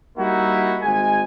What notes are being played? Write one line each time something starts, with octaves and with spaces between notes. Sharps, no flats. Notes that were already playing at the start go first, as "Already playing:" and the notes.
G3 A#3 D#4 E4 F#4
G#1 G#3 G#5